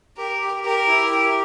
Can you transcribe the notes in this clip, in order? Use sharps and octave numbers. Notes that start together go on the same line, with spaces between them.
G4 A#4
G4
G4 A#4
E4
G4